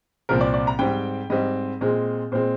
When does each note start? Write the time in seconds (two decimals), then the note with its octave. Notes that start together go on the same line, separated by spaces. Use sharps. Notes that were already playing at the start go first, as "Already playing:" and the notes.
0.29 C2 A#2 F3 C4 A#4
0.41 D5
0.54 D5
0.67 A#5
0.79 G#2 G3 C4 G5
1.30 G#2 G3 C4 D#5
1.81 A#2 G#3 C4
2.32 A#2 G#3 C4 C5